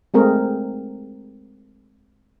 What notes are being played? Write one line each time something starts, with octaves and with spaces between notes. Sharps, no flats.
G#3 A3 C4 G#4 A#4